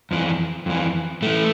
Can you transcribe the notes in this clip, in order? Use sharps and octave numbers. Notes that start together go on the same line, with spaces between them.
F2 E3
F2 E3
A2 E3 A3